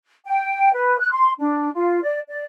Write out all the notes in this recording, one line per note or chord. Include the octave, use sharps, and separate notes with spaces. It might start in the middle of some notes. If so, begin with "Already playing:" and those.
G5
B4
F#6
C6
D4
F4
D5
D5